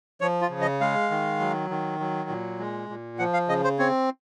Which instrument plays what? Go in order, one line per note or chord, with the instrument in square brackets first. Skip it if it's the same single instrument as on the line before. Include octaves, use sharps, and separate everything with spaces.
[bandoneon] F3 C#5
F4
C#3
D#5
G#3 F5
D#3
F#3
D#3
F#3
A#2
G#3
A#2
F3 F#5
F5
C#3 D#5
C5
C4 C#5